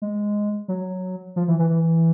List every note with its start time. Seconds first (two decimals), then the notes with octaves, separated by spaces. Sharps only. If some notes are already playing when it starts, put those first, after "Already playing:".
0.02 G#3
0.68 F#3
1.36 F3
1.48 E3
1.59 E3
1.70 E3